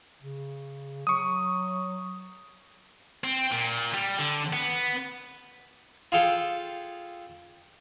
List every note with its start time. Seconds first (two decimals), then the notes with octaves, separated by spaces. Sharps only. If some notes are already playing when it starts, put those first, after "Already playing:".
0.22 C#3
1.07 F#3 C#6 D#6
3.24 C4
3.51 A#2
3.94 G3
4.19 D3
4.53 B3
6.12 F4 G#4 A4 F5 G5